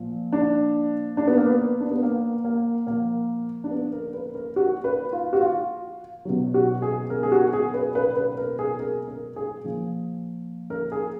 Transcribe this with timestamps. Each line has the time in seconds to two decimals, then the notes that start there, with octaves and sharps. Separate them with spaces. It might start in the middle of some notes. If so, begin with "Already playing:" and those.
Already playing: A#2 F3
0.33 D4
1.17 D4
1.27 B3
1.37 A#3
1.46 B3
1.80 D4
1.91 B3
2.02 A#3
2.45 A#3
2.87 A#2 F3 A#3
3.64 D4
3.71 B3
3.93 A#4
4.14 B4
4.35 A#4
4.56 F#4
4.84 B4
5.13 F4
5.33 F#4
5.41 F4
6.25 B2 F#3
6.54 F#4
6.82 G#4
7.10 A#4
7.23 G#4
7.32 F#4
7.53 G#4
7.74 B4
7.95 B4
8.17 B4
8.38 A#4
8.59 G#4
8.79 A#4
9.08 A#4
9.36 G#4
9.64 A#2 F3
10.70 A#4
10.92 G#4